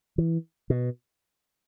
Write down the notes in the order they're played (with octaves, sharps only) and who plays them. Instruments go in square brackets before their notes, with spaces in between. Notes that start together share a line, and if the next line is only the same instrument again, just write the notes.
[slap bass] E3
B2